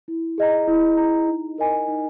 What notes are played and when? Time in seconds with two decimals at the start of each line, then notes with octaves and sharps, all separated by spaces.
0.08 E4
0.38 G#4 D#5 A#5
0.67 E4
0.97 G#4 D#5 A#5
1.28 D#4
1.58 A#4 D#5 G#5
1.88 D#4